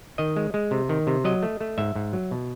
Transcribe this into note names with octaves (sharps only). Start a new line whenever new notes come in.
D#3 D#5
G#3
G#3
C3
D#3
C3
F#3 D#5
A3
A3
G#2 E5
G#2
F#3
B2